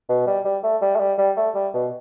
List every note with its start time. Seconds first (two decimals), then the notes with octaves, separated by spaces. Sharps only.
0.09 B2
0.27 G3
0.45 G3
0.63 A3
0.82 G3
0.96 A3
1.00 G3
1.18 G3
1.36 A3
1.55 G3
1.74 B2